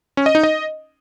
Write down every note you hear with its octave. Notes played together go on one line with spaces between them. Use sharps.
C#4
D#5
D#4
D#5